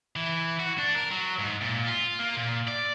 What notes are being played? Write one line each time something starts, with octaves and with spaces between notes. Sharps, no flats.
E3
F#4
D4
A#4
F#3
G#2
A#2
F4
A#3
A#2
D5